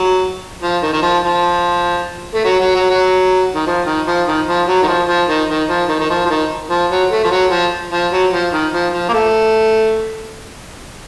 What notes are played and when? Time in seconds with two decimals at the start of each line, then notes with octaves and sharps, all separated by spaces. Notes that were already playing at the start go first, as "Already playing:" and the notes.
Already playing: F#3
0.63 F3
0.82 D#3
0.93 D#3
1.02 F3
1.23 F3
2.34 A3
2.44 F#3
2.60 F#3
2.75 F#3
2.90 F#3
3.54 D#3
3.66 F3
3.86 D#3
4.07 F3
4.27 D#3
4.47 F3
4.67 F#3
4.82 D#3
4.88 F3
5.08 F3
5.28 D#3
5.49 D#3
5.69 F3
5.89 D#3
5.99 D#3
6.10 F3
6.25 F3
6.30 D#3
6.70 F3
6.90 F#3
7.11 A3
7.24 F3
7.31 F#3
7.51 F3
7.91 F3
8.12 F#3
8.32 F3
8.52 D#3
8.72 F3
8.93 F3
9.09 A#3
9.13 A3